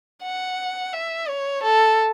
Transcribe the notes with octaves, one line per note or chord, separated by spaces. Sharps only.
F#5
E5
C#5
A4